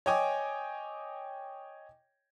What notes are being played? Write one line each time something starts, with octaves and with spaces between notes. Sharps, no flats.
C#5 D#5 G5 G#5 D6